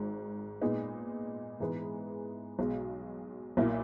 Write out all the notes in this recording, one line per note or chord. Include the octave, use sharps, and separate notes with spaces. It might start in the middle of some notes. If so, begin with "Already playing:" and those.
Already playing: G#1 G#2
A#2 G#3 B3 D#4
G#2 E3 G#3 B3
B1 B2 G#3
B1 A#2 A#3 E4